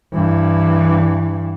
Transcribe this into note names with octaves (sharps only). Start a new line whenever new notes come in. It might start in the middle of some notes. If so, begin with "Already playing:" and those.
G2 E3